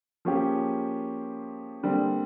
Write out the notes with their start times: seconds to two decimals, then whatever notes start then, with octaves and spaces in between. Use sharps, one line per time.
0.25 F3 A#3 C#4 F4 G4 G#4
1.83 D3 G3 A#3 C4 D4